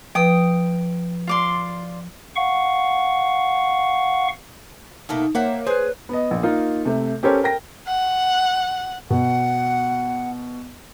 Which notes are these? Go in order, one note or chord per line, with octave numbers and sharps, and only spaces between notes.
F3 B4 G5 D#6
F4 D5 C6
F5 F#5 C#6
B2 A3 A#3 D#4
A#3 C5 C#5 E5 F#5
G#4 B4 C5
B3 D#5
A#1
A#3 D#4 F4
C3 A3
C#4 G4 A4 A#4 C5 C#5
A#4 G5 A#6
F#5
B2 F#5